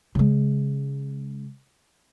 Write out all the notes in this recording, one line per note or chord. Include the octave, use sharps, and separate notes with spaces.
C#3 G#3